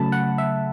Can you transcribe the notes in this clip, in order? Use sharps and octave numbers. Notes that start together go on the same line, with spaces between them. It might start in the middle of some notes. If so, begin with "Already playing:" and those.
Already playing: C#3 F#3 A3 A5 B5
F#5
E5